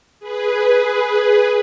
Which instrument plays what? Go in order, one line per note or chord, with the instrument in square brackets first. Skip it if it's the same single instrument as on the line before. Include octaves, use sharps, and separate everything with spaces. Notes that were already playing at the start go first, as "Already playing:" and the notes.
[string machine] G#4 B4